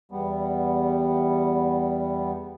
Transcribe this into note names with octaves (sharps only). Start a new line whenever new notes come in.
E2 G3 B3